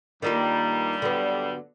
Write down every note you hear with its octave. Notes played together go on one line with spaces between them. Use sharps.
G2 D#3 G3 A#3 F4
D3 F#3 B3